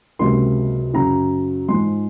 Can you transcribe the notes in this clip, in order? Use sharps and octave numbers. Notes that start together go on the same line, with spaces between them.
C#2 C3 F#3 A#3 C6
F#2 C#3 F#3 A#5
G#2 F3 G#3 C6